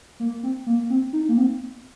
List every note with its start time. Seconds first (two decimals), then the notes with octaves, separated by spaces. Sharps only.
0.20 A#3
0.43 C4
0.67 A#3
0.90 C4
1.13 D#4
1.29 A#3
1.37 C4